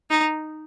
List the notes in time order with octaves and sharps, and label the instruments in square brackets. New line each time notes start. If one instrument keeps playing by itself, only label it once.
[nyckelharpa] D#4